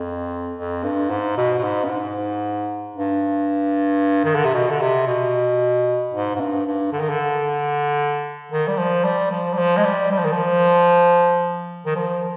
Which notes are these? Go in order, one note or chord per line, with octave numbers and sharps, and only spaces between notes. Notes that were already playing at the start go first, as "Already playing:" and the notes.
Already playing: F2
F2
G2
G#2
B2
B2
G#2
G2
G#2
G2
D#3
D3
C3
B2
D3
C3
B2
G#2
G#2
G2
G2
D3
D#3
D3
D#3
G3
F3
G3
F3
G3
F3
G#3
G3
G3
F3
D#3
F3
D#3
F3